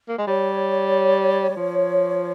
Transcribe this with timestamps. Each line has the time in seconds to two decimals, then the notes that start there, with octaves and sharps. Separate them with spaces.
0.09 A#3
0.18 G#3
0.27 G3 C#5
1.49 G3
1.57 F3